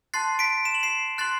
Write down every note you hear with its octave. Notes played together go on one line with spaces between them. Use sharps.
A5 C6 F#6 A6 C7
B6 D7
E7
F#7
C7 E7
C6 F#6 A6 C7